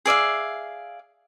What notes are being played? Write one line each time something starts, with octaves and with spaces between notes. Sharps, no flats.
G#4 D5 E5 F5